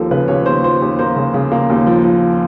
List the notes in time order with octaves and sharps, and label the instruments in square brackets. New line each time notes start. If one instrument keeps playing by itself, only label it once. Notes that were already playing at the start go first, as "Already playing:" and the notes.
Already playing: [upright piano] D#2 F3 A#3 A4
C#3 B4
D#2 C#5
D#2 C5
F3 C5
D#2
A#3 C5
C#3
C#3
A#3
D#2
F3
F3